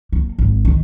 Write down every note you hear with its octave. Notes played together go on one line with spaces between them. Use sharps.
A#3
G#1
D#3